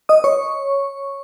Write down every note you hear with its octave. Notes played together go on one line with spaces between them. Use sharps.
D#5 D#6
C#5 C#6